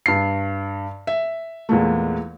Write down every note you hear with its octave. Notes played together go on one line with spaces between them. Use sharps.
G2 C7
E5
E2 A#2 G#3 A3